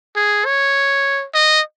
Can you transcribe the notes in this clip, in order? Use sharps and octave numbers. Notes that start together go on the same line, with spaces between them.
G#4
C#5
D#5